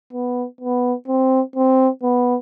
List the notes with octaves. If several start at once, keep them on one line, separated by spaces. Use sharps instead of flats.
B3
B3
C4
C4
B3